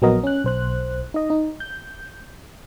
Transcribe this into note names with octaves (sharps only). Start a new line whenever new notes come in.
A#1 F#3 B3 F#4 A#4 D#5
C#4 F#6
B1 C5 F#6
D#4 D#5
D#4
G6